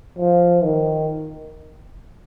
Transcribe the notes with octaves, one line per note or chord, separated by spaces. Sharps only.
F3
D#3